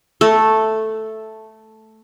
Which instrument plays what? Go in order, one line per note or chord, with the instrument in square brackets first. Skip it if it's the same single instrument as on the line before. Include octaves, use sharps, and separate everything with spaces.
[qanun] A3 A4